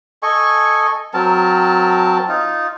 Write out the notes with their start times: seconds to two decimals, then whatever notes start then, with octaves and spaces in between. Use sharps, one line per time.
0.23 A4 D#5 G#5 C#6
1.14 F#3 C4 A#4 A5
2.29 D#4 F4